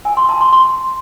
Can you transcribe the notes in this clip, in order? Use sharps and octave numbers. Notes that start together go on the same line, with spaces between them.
G#5
C6
A5
C6
C6